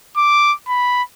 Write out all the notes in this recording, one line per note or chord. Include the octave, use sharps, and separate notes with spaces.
D6
B5